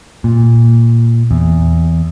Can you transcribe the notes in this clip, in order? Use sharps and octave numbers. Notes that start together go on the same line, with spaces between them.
A#2
E2